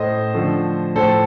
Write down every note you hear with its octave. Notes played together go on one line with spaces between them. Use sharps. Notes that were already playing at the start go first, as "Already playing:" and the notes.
Already playing: A2 A3 C5 D#5
D3 F3 A3
A2 F3 A3 A4 C5